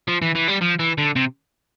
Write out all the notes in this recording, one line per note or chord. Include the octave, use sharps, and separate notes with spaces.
F3
E3
E3
G3
F3
E3
D3
C3